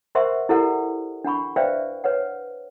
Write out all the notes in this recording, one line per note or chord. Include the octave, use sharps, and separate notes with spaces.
A#4 C5 E5 F#5 C6 C#6
E4 G4 A4 A#4 D5 F#5
D4 F#5 B5 C#6
B4 C5 D5 E5 F5 G5
B4 C#5 F#5